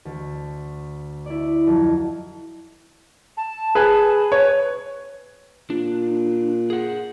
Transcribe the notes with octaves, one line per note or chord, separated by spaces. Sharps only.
D2
E4 D5
F2 F#3
A5
G#4 B4
B4 C#5
A#2 D4
G#4 F#5